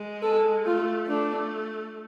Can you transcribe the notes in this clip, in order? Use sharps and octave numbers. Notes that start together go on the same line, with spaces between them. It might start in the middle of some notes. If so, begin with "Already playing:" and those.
Already playing: G#3
A4
A3 F4
A3 D4